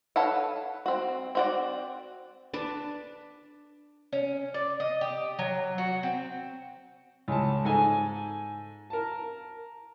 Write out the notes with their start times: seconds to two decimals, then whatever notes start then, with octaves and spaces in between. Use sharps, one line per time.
0.16 A4 B4 C#5 F5 F#5
0.86 C4 F#4
1.35 C4 F#4 D5
2.53 D4 B4 A5
4.13 C#4
4.54 D5
4.80 D#5
5.01 G4
5.39 F#3
5.78 F#4
6.03 C4
7.28 C#2 A5
7.65 G#2 A4 G#5
8.90 A#4 A5